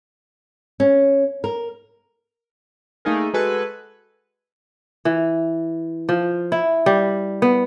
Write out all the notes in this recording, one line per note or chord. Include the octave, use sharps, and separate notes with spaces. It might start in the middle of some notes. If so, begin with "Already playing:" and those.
C#4
A#4
A3 A#3 D#4 G#4 A#4
G#3 F#4 A4 B4 G#5
E3
F3
E4
G3
B3